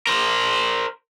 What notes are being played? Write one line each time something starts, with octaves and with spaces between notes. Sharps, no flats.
A#4 C5